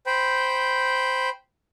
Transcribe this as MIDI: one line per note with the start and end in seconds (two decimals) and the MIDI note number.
0.06 1.29 72
0.06 1.29 79
0.06 1.29 83